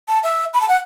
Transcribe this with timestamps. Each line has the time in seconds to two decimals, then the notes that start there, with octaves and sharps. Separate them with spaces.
0.08 A5
0.23 E5
0.54 B5
0.61 A5
0.68 F#5